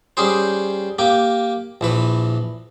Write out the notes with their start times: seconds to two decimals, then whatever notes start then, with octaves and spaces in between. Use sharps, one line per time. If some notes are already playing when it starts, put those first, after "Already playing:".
0.17 G3 C#4 G4 G#4 C5
0.99 A#3 G4
1.81 A#1 E3 B4